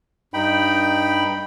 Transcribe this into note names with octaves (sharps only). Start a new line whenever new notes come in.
G2 D#4 G5 B5